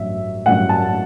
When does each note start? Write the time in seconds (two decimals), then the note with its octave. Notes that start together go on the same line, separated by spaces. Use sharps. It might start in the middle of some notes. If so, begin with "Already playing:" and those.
Already playing: A1 G2 F#3 E5
0.46 A1 G2 F#3 F#5
0.69 A5